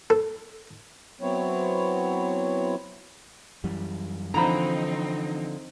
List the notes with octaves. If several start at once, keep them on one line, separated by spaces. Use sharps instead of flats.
A4
F#3 B3 C4 E4 C#5
F#2 E3 G3
D3 E3 F3 C4 D#4 C5 A#5 B5